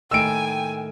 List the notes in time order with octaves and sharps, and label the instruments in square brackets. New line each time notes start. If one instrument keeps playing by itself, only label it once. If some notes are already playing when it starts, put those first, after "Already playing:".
[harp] A2 D#3 [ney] G5 [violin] G#5 [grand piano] E6 D7